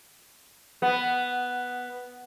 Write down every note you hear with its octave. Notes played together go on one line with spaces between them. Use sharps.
B3